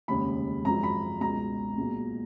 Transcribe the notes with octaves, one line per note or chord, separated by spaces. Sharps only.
F1 D#2 C#3 G#3 B5
G#1 F#2 F3 G#3 A#5
B5
C#2 B2 G#3 A#5
B1 A#2 G#3